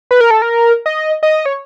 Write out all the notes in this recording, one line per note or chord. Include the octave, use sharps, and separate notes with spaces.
B4
A#4
A4
A#4
D#5
D#5
C#5